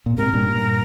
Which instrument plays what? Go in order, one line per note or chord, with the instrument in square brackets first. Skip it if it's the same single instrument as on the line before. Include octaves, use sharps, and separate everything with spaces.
[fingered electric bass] A#2
[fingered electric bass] G#2 C3 [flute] A#4
[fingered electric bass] G2 A#2
G2 A#2